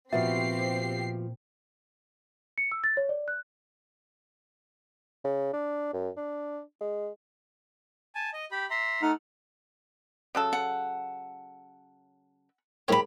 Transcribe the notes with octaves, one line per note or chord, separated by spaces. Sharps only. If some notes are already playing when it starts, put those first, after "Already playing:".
A#2 F3 B3 C4 F#4 G4 E5 C7
C#7
E6
A6
C#5
D5
F#6
C#3
D4
F#2
D4
G#3
G#5 A5
D#5
G4 B5
E5 A#5 C6
A3 D#4 F#5 F6
C#3 F#3 A4
F#5
G#2 A#3 G4 C#5 B5